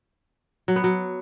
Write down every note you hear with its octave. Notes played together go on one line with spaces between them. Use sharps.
F#3
B3
F#3